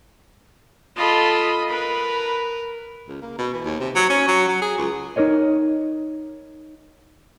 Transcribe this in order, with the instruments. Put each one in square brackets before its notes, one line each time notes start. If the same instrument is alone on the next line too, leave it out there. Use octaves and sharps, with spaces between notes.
[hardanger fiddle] F4 A4 [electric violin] D#5 B5
[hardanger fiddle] A#4 [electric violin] B4 B5
[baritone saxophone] C#2
A#3
B2
E3
D#2
C3
F#3
C#4
F#3
F#3
G#4
C#2
[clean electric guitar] D#4 G4 A#4 C#5 D#5